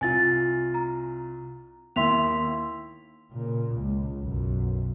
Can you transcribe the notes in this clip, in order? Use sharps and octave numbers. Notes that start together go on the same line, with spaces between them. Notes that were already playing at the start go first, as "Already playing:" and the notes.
C2 F4 G#5 A6
A#5
D#2 E4 E5 C6 B6 F7
A#2 C#3
C#2
B1 F#2